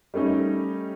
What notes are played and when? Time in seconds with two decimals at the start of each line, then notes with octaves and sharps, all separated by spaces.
0.14 G3 A3 C#4 D#4